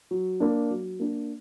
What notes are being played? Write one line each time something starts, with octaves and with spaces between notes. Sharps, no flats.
F#3
A#3 D4
F#3
A#3 D4